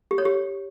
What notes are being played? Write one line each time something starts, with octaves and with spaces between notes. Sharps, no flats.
G4
C#5
G4